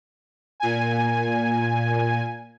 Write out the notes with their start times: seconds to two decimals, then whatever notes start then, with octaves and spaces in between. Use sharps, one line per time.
0.60 A#2 G#5